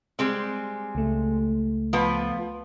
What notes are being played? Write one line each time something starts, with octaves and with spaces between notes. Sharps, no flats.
G3 G#3 C4
C#2 A3
F3 B3 B4